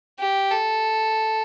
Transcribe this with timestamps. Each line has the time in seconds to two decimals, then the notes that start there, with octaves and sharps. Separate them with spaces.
0.20 G4
0.51 A4